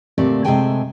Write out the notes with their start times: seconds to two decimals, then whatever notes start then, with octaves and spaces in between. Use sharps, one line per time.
0.18 D2 A#2 A3 C4 G4 D5
0.44 C3 G#3 A3 C5 G5 G#5